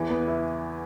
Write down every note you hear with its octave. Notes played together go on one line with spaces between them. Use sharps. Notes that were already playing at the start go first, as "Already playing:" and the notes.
Already playing: E2 E3
B3
E4